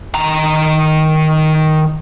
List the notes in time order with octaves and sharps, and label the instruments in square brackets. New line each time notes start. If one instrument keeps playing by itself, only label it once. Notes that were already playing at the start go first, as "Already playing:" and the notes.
[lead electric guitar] D#3 A#5